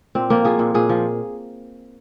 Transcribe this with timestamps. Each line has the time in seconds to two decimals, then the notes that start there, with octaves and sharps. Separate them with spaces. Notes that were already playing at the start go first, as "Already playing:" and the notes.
0.15 A#2 C4
0.30 F3 A#3
0.45 F3 G#4
0.59 A#2
0.74 A#2 G#4
0.89 F3